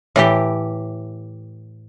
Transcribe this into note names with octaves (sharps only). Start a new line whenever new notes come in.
A2 E3 G4